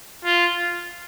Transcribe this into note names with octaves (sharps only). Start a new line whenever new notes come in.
F4